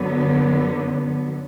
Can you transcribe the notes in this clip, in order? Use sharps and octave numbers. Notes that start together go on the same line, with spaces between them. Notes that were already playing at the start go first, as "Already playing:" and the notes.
Already playing: F#2 D3 F#3 B3